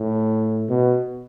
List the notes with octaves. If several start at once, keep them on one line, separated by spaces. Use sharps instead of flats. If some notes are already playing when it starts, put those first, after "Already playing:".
Already playing: A2
B2